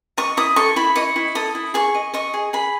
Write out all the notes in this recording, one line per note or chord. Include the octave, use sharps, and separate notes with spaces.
D#5 C#6
E4 D#6
A4 C#6
E4 B5
D#5 C#6
E4
A4 D#6
E4
G#4 C#6
D#5
D#5 C#6
G#4
G#4 B5